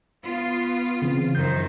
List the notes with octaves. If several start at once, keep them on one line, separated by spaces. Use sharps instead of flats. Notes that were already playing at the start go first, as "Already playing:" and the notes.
B3 F4
C#3 E3 C4
F#2 D#3 C5 G6